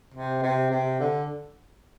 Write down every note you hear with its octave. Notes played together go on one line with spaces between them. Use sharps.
C3
C3
C3
D3